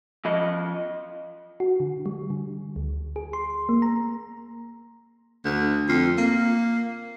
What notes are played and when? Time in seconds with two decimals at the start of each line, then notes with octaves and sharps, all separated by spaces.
0.25 F3 D#5
1.60 F#4
1.80 D3
2.06 G3
2.30 D3
2.76 D2
3.16 G#4
3.33 C6
3.69 A#3
3.82 A#5
5.45 D2
5.89 F2
6.18 A#3